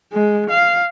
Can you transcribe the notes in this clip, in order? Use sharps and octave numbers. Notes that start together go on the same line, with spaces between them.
G#3
F5